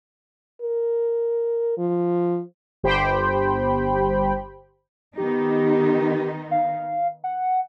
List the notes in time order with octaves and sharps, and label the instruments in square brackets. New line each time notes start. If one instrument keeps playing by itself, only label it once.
[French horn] A#4
F3
[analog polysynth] G1 G4 C5 G5 B5
[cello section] D#3 B3 D#4 [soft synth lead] G4
[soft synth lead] F5
F#5